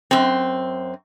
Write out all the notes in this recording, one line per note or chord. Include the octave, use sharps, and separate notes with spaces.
F#2 C4